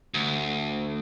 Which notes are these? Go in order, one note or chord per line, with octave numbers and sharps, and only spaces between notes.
D2